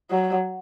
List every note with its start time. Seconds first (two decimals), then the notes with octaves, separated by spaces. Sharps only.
0.11 F#3